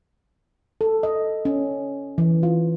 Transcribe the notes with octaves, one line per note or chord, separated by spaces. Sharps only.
A4
D#5
C#4
E3
F4